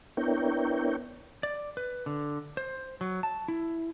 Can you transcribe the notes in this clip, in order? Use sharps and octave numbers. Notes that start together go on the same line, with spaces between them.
B3 D4 E4 A#4 C#5 G5
D5
B4
D3
C5
F#3
A5
E4